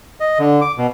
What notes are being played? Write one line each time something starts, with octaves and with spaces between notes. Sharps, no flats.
D#5
D3
D6
B2